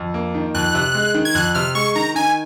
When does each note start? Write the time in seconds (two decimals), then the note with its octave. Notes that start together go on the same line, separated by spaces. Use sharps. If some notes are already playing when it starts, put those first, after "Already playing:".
Already playing: F2
0.14 A#3
0.35 D#3
0.54 F2 F#6
0.75 C3
0.95 G#3
1.14 D#3
1.25 G#6
1.35 F2 F#6
1.55 C3 F6
1.75 G#3 C#6
1.95 D#3 A#5
2.15 D#3 G#5